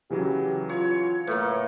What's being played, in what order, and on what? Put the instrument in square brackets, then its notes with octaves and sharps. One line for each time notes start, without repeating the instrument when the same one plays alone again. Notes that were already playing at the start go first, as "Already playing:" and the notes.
[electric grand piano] C#3 E3 F#3 [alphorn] G4
[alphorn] F4 [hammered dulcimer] C#5
[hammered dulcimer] A2 A#3 [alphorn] B4